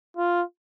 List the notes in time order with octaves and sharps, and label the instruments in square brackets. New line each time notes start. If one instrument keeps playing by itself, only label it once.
[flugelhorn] F4